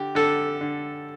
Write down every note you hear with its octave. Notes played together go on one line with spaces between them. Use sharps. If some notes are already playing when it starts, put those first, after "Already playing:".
Already playing: D3 G4
D3 A4
D3